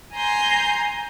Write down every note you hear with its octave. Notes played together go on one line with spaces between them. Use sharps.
G#5 A#5 C6 G6